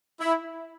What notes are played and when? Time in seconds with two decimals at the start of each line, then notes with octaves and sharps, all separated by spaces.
0.21 E4